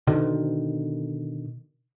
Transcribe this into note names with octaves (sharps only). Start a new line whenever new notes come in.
B2 D3 D#3